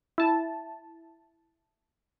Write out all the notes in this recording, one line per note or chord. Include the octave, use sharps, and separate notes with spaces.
E4 A5